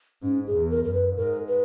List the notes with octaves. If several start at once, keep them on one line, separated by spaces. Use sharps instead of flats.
G#2 C#4
G#4
E2
A#4
F#2 A#4
B4
G#2 A#4
B4